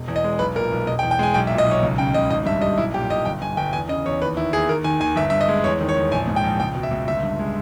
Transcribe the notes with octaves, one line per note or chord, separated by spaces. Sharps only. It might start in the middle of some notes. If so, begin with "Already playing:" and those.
Already playing: E1
E2
D#5
G#3
B1 B4
A#2 A#4
B1
E1 D#5
G5
E2
G5
G#3 G#5
B1 G5
E5
A#2
D#5
B1 C#5
C#2
C#3 G5
C#2 D#5
G#1 D#5
G2 E5
G3 D#5
B1 E4
A#2 G4
B1 D#5
G1 G5
G2 G#5
G1 G5
E2 G#5
C#3 D#5
E2 C#5
D#2 B4
D#3 E4
D#2 G#4
D#2 A#4
D#3 G#5
D#2 G#5
G1 E5
G2 E5
D#5
G#3
E2 C#5
D#3
C#5
E2
A#1 G#5
G#2
G5
A#1
C#2 G5
B2
E5
C#2
G1 E5
G2
G#3